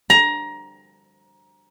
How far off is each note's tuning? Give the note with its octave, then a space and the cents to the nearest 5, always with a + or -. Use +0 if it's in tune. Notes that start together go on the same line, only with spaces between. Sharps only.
A#5 +20